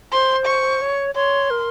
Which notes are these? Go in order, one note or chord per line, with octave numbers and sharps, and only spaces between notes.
C5 C6
C#6
C#5
C#5 C6
A#4